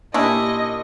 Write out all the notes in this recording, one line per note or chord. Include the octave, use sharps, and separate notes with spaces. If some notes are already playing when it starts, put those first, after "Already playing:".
A#2 C#4 D4 E4 G4 D#5